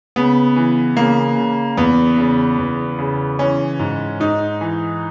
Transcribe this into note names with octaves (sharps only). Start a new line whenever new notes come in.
C#3 B3
E3
C#3 A#3
C#3
E2 B3
C#3
E2
C#3
E3 C#4
G#2
G#2 D#4
E3